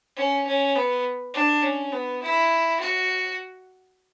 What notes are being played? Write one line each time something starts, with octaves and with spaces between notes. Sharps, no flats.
C#4
C#4
B3
D4
C#4
B3
E4
F#4